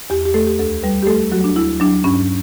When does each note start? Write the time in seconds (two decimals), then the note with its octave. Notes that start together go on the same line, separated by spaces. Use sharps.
0.10 E2 G4
0.26 G4
0.34 A3 A4
0.47 G4
0.59 D2 A4
0.83 G3 B4
1.03 G4
1.07 A3 A4
1.32 F#3 F#4
1.44 D4
1.55 D2 E4
1.80 F#3 D4
2.04 G2 C#4